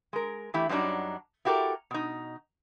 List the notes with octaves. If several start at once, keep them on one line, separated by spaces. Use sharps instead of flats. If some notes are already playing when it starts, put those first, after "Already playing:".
G#3 A#4
E3 A3 E4 G4
F#2 F#3 G3 D4 D#4
E4 F#4 G4 A4 A#4
B2 D#4